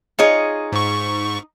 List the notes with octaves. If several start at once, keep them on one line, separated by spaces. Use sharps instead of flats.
D#4 F4 G#4 C#5
G#2 C#6